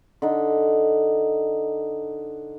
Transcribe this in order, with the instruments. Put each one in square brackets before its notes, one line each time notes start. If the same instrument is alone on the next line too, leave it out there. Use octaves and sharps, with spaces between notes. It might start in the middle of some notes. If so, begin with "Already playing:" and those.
[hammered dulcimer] D3 D#4